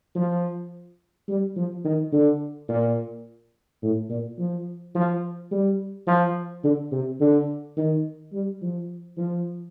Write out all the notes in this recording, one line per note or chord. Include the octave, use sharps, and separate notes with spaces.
F3
G3
F3
D#3
D3
A#2
A2
A#2
F3
F3
G3
F3
D3
C3
D3
D#3
G3
F3
F3